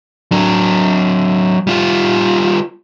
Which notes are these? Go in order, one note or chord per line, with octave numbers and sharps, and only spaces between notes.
F#3 D4
G3 F4